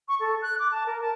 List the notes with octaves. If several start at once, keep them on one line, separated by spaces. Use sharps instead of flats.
C#6
A4
F#6
D6
A5
A#4
A5